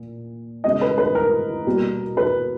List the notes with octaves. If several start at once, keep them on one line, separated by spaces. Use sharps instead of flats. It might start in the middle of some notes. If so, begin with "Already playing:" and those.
Already playing: A#2
C#3 G#3 B3 D#5
B4
B4
A#4
B2 G3 A#3
B4